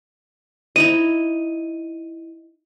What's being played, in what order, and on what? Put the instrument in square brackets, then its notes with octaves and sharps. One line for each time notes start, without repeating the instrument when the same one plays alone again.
[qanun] D#4 E4 D#5 [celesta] D#7